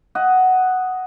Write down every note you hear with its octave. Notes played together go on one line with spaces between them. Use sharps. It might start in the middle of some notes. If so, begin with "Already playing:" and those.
D#5 F#5